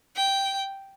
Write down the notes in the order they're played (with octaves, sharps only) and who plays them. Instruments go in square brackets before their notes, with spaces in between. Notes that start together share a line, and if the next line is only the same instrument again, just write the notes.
[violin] G5